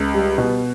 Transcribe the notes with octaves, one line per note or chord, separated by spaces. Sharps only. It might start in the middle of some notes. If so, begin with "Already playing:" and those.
Already playing: C#2
G3
B2